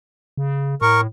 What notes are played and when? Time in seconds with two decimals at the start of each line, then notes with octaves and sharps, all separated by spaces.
0.37 C#3
0.82 A2 A#4 C#6